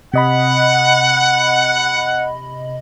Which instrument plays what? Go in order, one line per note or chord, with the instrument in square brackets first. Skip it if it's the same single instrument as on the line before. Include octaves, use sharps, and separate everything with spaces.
[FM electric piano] C3 D#5 B5 [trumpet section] F#5